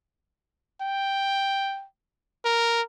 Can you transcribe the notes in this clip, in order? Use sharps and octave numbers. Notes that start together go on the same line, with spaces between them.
G5
A#4